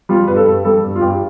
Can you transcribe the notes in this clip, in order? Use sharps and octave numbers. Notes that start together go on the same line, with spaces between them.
G3 F4
G2 B4
A4
G2
G3 A4
G2
F4
G2 G4